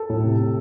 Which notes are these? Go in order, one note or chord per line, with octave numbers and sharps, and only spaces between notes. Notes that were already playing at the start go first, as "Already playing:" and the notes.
Already playing: A4
A2
C3